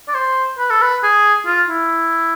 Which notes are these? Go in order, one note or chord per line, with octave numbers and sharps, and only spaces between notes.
D5
C5
B4
A4
B4
G#4
F4
E4